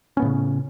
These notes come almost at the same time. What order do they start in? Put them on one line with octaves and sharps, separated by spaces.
C#4 B3 A2 C#3